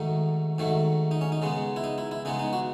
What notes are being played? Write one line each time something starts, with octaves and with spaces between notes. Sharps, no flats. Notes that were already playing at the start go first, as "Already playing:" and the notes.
Already playing: G#2 D#3 F#3 A3 D#4
G#2 D#3 F#3 A3
D#4
C#4
D#4
C#3 G#3 B3
E4
D#4
E4
E4
C#3 G#3 B3 D#4
D#4
F#4